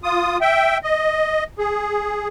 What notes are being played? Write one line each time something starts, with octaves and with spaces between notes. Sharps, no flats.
F4 D#6
E5 G5
D#5
G#4